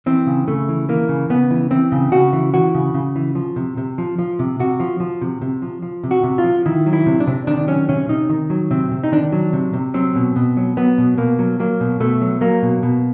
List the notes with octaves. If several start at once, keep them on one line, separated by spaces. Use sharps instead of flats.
E3 C4
C#3
C#3 A3
E3
E3 A#3
C#3
C#3 B3
E3
E3 C4
C#3
C#3 F#4
E3
E3 F#4
C#3
C#3
E3
F3
C3
C3
F3
F3
C3
C3 F#4
F3
F3
C3
C3
F3
F3
C3
F#4
C3
F4
F3
D#3 E4
F#3
E4
C3
D4
C3
D#3 D4
F#3 C#4
C3 C#4
C3 D#4
D#3
F#3
C3 C4
C3
D#4
D#3 D4
F#3
C3
C3
F#3 C4
B2
B2
F#3
F#3 B3
B2
B2 A#3
F#3
F#3 A#3
B2
B2 A3
F#3
F#3 A#3
B2
B2